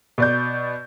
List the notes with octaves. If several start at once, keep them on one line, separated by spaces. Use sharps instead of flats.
B2 D5 G6